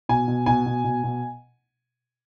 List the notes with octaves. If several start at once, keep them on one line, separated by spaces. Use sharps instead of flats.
B2 G#5
B2
B2 G#5
B2
B2
B2